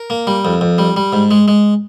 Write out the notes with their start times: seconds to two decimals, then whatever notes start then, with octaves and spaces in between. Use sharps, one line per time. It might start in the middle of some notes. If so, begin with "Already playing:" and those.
Already playing: A#4
0.10 A#3
0.27 G3
0.45 F2
0.61 F2
0.78 G3
0.96 G3
1.13 G#2
1.31 G#3
1.48 G#3